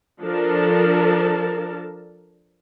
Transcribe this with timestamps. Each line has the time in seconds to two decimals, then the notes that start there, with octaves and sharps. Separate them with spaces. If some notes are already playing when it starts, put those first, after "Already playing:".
0.22 F3 D4 A4 A#4 A5